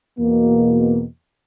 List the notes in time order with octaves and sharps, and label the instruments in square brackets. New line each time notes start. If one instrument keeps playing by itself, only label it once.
[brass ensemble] E2 B2 A#3